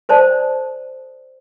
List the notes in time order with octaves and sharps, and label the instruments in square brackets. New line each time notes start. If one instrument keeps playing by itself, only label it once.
[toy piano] A4 C5 D5 A5